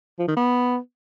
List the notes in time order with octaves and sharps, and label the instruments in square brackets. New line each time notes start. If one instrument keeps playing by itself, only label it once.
[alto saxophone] F3
D#3
B3